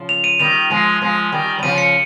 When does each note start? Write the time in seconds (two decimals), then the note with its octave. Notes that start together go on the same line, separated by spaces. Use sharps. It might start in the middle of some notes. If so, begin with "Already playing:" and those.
Already playing: C#3 F3
0.09 F7
0.24 D#7
0.40 D#3 G3 F7
0.70 F3 G#3
1.01 F3 G#3
1.32 D#3 G3
1.59 G3
1.63 C#3 F3 D#7
1.78 C#7